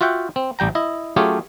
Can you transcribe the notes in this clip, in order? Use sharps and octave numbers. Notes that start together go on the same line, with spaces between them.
F4 F#4 E5 F#5 G5
C4
A1 G3 G5 A#5
E4 D#5
F#3 A3 C#4 F4 G4 G#4